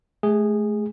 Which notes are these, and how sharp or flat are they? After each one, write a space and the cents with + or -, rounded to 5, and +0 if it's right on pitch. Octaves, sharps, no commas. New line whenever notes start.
A3 -35 G#4 -15